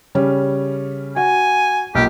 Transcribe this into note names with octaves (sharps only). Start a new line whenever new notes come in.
C#3 G3 C#4
F#4 G#5
B1 A#2 G4